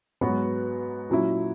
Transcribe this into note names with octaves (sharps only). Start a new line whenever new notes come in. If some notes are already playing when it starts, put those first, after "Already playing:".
G#2 F#3 B3 F#4 C#5
A#2 F#3 C#4 E4